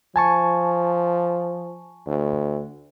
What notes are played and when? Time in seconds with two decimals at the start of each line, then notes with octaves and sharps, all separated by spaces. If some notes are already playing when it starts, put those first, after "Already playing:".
0.16 F3 G#5 A5 C#6
2.07 D2